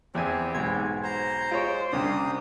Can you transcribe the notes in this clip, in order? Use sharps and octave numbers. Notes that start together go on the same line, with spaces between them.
E2 C4 G4 E5 G#5
B1 G#2 G#6
C5 A#5
G#3 F4 C#5 D7
C2 C3 A#3 C#4 D4 G4 D#6